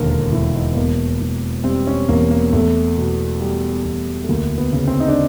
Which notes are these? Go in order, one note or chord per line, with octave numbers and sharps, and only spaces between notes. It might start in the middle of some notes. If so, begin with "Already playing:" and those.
Already playing: E1 D#2 D3 A#4
A#4
E1 E4
D#4
B3
E2 A#3
E1
G3 C4
C#4
E2 A#3
A#3
E2 A3
B2
G3
E2
A3
D2 A#3
B3
C#3
C4
D#4
D4